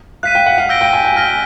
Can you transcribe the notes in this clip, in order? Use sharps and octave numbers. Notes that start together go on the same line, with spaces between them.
F5 F#6 B6 D#7
G5
F#5
F5
E6 G6 A#6 D7 G7
G5
G#5
G5
G#5 F6 A#6 D7 G7